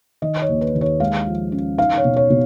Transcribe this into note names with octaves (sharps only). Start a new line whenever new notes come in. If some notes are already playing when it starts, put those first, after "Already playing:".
D#3 D#5
C#5
D#2
B4
D#2
C#5
G#3 F5
F3
C#4
D#4 F5
C#5
B2
C#5
B2